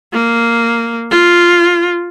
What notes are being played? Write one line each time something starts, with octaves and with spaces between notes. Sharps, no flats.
A#3
F4